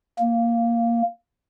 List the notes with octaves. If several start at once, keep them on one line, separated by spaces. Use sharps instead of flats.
A#3